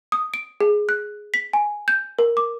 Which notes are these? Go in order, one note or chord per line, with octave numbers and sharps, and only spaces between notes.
D#6
D7
G#4
F#6
B6
G#5
G6
A#4
D6